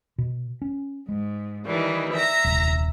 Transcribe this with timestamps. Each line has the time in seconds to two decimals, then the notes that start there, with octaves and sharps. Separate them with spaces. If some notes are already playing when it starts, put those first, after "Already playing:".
0.18 B2
0.62 C#4
1.09 G#2 G#3
1.65 D#3 E3 G3
2.13 E5 A#5 A#6
2.44 D#1 C2